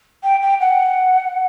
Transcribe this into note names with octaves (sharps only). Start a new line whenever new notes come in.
G5
G5
F#5